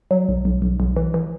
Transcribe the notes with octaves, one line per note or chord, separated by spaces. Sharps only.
F#3
B1
B1
B1
B1
E3
E3